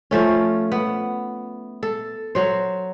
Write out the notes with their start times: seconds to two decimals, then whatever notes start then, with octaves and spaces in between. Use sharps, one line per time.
0.11 F3 A3 C#4
0.72 B3
1.83 A4
2.35 F#3 C5